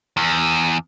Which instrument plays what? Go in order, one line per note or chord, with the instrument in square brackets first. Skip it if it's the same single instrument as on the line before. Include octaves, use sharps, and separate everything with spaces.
[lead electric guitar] E2